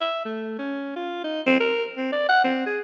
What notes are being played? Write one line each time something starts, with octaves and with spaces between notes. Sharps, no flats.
E5
A3
C#4
F4
D#4
C4
A#4
C4
D5
F#5
C4
G#4